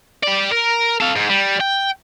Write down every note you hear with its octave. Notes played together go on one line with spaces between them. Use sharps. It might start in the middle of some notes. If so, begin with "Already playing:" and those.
G4 D5
A#4
A4 F5
G#2
G3
G5